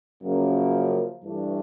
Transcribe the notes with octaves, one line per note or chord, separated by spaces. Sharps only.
F#2 C#3 F3 A#3
G2 E3 A3 D4